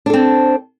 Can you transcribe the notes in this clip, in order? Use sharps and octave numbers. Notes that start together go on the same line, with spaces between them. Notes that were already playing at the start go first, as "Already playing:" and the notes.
C4 D4 A4